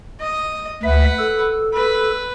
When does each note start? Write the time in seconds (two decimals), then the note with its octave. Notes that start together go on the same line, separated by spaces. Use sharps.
0.21 D#5
0.83 D2 B4 E5 F#5
1.19 A4
1.74 B4